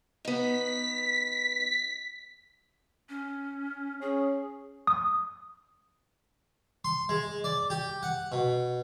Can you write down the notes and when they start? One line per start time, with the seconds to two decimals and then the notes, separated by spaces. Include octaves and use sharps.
0.25 B3 D#4 B6
3.09 C#4
4.01 C#4 G#4
4.87 D#6
6.85 C6
7.09 G#3
7.44 D5
7.70 G4
8.03 F#5
8.32 B2